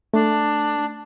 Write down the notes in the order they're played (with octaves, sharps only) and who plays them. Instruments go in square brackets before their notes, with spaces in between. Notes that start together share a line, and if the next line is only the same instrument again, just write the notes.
[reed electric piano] A3 [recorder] D4